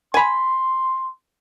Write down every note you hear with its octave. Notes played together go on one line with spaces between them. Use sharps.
G#5 B5 C6